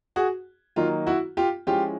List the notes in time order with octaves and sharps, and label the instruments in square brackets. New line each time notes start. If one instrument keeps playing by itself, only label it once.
[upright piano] F#4 G#4
D#3 F#3 A#3 D#4 F4
E4 F#4
F4 G4
F3 G#3 C#4 E4 F4 G4